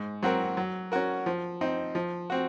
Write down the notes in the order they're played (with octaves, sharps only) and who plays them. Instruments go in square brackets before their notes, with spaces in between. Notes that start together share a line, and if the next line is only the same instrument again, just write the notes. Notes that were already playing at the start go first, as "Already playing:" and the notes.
Already playing: [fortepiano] G#2
F#3 C4 F#4 A#4
F#3
C#4 F#4 A#4
F3
C4 D#4
F3
C4 F#4